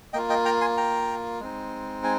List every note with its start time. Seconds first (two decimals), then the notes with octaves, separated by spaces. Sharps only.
0.13 A#3 F4 D#5 G5
0.30 D#5 G5
0.45 G5 A#5
0.61 G#5 C6
0.77 G5 A#5
1.40 G#3 C4 D#4
2.04 G#5